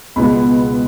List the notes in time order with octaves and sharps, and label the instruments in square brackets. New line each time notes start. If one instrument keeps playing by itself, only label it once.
[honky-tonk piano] C#2 B2 G#3 B3 B5